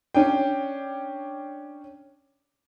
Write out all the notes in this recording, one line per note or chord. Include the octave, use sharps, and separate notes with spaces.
C#4 D4 G5